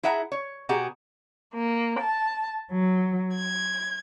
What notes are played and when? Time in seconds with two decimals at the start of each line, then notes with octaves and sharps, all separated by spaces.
0.03 E4 G#4 E5 F#5 A#5
0.32 C#5
0.69 B2 G4 G#4 F#5 A#5
1.54 A#3
2.00 A5
2.71 F#3
3.35 G#6